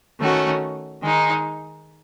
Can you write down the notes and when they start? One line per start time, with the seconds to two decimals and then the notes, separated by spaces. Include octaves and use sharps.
0.19 D#3 A3 C#4 F#4
1.01 D#3 G#3 D#4